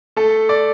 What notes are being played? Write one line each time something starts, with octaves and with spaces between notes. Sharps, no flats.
A3 A4
D5